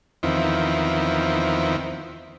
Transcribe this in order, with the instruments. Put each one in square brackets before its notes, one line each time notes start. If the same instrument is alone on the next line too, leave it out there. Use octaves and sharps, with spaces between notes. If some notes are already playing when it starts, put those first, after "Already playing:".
[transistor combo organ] E2 D#3 F3 C4 E4